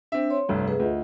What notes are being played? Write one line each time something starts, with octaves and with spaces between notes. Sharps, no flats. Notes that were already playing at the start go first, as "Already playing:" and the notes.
C4 D4 E5
C#5 C6
F1 C2 G2
G#4 B4
D2 F4 D#5